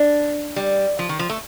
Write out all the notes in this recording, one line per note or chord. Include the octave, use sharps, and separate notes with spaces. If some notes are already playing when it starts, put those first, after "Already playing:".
Already playing: D4
G3
F3
D#3
F3
A3